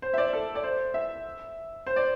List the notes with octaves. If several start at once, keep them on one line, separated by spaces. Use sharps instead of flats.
C5
E5
D5
A4
D5
C5
E5
C5
D5